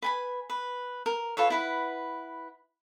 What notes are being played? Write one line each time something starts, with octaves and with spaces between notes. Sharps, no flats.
B4 G#5 B5
B4
A#4
F4 A4 B4 C#5
E4 B4 F#5